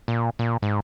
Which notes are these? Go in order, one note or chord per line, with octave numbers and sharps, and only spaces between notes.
A#2
A#2
G#2